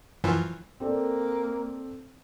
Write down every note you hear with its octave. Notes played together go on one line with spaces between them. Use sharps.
F#2 E3 F3
A#3 C4 A4 D5